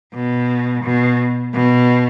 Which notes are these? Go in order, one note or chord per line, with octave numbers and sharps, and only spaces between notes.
B2
B2
B2